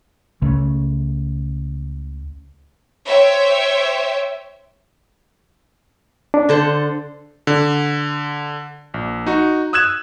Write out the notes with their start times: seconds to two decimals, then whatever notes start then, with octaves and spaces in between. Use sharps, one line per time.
0.42 C#2 C#3 A3
3.06 C5 C#5 E5 G5
6.34 D4
6.49 D3 A4 C5
7.47 D3
8.94 A#1
9.26 D#4 F#4
9.73 D#6 E6 F#6 G#6 E7